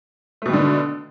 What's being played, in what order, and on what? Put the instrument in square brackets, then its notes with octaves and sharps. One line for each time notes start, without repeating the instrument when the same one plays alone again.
[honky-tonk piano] A3
B2
D#3
D3